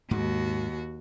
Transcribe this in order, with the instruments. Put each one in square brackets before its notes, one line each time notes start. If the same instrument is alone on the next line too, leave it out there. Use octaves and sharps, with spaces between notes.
[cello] D#2 F#4 [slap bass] G#2 G#3